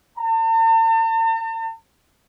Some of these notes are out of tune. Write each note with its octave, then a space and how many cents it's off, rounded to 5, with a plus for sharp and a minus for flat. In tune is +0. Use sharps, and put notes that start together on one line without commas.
A5 +45